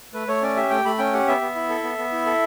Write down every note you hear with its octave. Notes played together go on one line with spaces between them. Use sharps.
A3 B4
A3 C#5
C#4 D5
G4 E5
A3 G5
A3 B5
C#4 G5
G4 F#5
B3 E5
B3
E4
A4
B3
B3
E4
A4